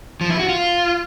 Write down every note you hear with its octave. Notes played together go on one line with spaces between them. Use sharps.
F3
E4
F#4
F4